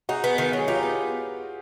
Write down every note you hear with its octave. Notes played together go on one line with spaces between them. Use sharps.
D#4 F#4 G#4
B3
D#3
F#3
G#4
D#4 F4 G4
B3